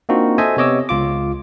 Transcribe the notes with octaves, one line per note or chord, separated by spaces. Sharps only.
A#3 C4 D4 D#4 F4 F#4
A4 C5 D#5 E5 G#5
C3 B3 C#5 D#5 D6 E6
C#2 F4 D6